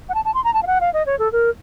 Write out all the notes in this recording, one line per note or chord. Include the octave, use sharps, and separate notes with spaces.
F#5
A5
A5
C6
A#5
A5
F5
F#5
F5
D#5
C#5
A4
A#4